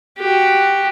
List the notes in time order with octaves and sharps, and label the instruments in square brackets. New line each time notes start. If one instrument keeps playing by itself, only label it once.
[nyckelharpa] F#4 G4